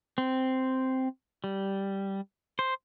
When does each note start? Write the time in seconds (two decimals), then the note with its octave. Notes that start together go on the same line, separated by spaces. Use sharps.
0.18 C4
1.44 G3
2.59 C5